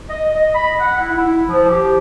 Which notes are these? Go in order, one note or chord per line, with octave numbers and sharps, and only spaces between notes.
D#5
D#5
B5
F#5
E4
E4
F3
G4